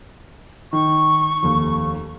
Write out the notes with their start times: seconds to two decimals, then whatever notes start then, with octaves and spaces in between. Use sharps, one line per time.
0.73 D#3 C#6
1.43 F1 D#2